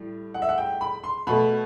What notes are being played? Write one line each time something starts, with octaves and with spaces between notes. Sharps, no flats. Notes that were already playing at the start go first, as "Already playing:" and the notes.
Already playing: A2 G3
F#5
E5
F#5
G5
B5
C6
B2 A3 B5